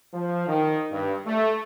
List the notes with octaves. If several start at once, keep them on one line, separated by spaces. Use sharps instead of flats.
F3
D#3
G2
A3